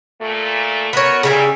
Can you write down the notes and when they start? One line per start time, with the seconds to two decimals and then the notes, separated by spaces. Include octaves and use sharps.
0.20 A#2 A3
0.93 F#2 B3 F#4 A#4 C#5
1.23 G2 A#2 C#3 G3 E5 G#5